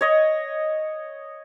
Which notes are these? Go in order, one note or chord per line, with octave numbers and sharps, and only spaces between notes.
C#5 D#5